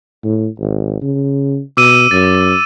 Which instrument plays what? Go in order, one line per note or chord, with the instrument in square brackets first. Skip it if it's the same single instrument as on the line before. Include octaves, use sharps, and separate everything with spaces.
[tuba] A2
G#1
C#3
[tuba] B2 [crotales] D6 E6 D#7
[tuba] F#2 [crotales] A6